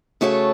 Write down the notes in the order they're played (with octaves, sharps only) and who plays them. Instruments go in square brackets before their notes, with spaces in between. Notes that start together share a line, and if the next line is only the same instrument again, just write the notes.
[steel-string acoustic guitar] C#3 A3 F#4 A4 C#5